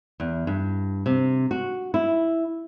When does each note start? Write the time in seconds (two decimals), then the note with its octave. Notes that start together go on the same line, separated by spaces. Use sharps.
0.20 E2
0.47 G2
1.06 C3
1.51 F#4
1.94 E4